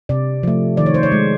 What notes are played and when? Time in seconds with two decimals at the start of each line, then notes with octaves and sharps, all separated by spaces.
0.09 C3 D5
0.43 F3 A3
0.77 D#3 D5
0.86 C#5
0.94 C5
1.03 C#5
1.12 G#3